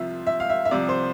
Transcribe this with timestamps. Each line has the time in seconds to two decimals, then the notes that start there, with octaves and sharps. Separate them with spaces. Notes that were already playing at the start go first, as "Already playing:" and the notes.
Already playing: C2 C3 F3 F4 E5
0.27 E5
0.40 F5
0.50 E5
0.65 E5
0.71 C2 C3 F3 D5
0.89 C5